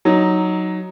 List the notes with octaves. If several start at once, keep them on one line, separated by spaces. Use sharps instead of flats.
F#3 D#4